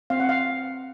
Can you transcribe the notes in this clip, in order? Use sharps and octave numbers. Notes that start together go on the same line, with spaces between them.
C4 F5
F#5
F5